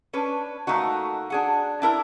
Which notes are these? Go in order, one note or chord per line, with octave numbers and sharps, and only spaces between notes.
C#4 D4 B4
A3 A#3 D#4 F#4
D4 G#4 F#5
D4 E4 A#4